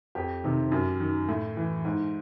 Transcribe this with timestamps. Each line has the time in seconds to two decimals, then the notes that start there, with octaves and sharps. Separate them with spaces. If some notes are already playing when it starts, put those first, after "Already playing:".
0.15 F2 G4
0.44 C3 D#3
0.72 F#2
1.00 D#3
1.29 A2
1.57 E3
1.85 G#2